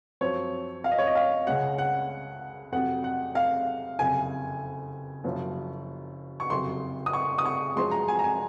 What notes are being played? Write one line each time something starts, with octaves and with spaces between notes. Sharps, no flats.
F#2 F3 C4 C#5
F5
D#5
C#5
D#5
F5
C#2 C#3 G#3 C#4 F#5
F#5
F2 C3 F#3 F#5
F#5
F5
F#1 F2 C3 G#5
F#1 F#2 F3 A#3
C#6
F#1 F2 C3 F#3 C6
D#6
C#6
D#6
C#6
F#2 F3 G#3 C6
A#5
G#5
A#5
G#5